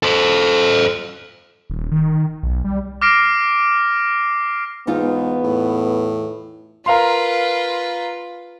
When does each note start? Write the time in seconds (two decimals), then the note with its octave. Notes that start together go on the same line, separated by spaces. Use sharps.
0.03 A4 C5
1.70 D#1
1.92 D#3
2.43 B1
2.64 G3
3.01 D6 F6 A#6 C7 D7
4.87 E2 G#2 B3 D#4 F4
5.44 A2
6.86 F4 A#4 B4 F5 C6